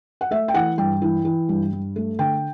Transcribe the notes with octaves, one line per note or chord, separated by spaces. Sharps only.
F#5
A3 E5
G5
E3 F#5
G2 G5
E3
E3
G2
G2
A3
D3 G5